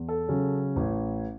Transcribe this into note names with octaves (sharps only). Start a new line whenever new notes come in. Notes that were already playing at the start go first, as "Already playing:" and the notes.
Already playing: E2
A4
C#3 F#3 C#4
A1